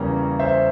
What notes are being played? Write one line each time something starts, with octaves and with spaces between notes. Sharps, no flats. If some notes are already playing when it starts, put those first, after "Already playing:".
Already playing: E2 C#3 G3 A#3 C#4 A#5
C5 E5